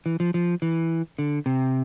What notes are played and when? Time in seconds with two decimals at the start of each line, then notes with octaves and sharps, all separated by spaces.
0.06 E3
0.20 F3
0.34 F3
0.62 E3
1.19 D3
1.46 C3